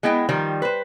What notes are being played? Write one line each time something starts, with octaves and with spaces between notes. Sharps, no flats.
G#3 B3 E4 D#5 G5
D#3 F3 G3
B4 C5